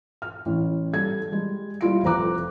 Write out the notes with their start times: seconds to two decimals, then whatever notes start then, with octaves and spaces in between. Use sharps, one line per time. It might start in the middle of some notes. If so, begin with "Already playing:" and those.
0.22 F6
0.46 A1
0.93 G3 A4 G#6
1.32 G3 G#3
1.81 G3 E4 F4 D7
2.03 F1 F2 C5 A#5 D6 F#6